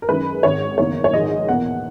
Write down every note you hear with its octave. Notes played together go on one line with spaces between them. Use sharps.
A#4
F#2 D#3 G#3 B4
G#1 G#2 D#3 C#5
F#1 E2 D#3 A#3 C#5
C#5
A#1 G#2 D#3 D#5
E2 B2 A#3 F#5